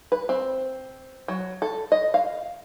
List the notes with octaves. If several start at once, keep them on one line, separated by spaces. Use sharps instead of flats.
B4
C4
F#3
A4
D#5
F5